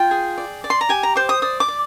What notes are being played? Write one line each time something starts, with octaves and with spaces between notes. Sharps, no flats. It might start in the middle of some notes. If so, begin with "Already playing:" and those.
Already playing: F4 G5
G#4
D5
D5
C6
A#5
G4 G#5
A#5
C5 D6
D#6
D5 D#6
D6
D5